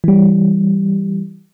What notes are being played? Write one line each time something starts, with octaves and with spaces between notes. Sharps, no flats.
E3 G3